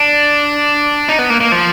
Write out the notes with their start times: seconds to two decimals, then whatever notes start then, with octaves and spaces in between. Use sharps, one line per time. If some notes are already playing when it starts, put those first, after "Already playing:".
Already playing: D4
1.09 D#4
1.19 B3
1.30 A#3
1.41 A#3
1.52 F3